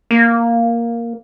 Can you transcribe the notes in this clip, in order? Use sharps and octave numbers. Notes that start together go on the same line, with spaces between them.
A#3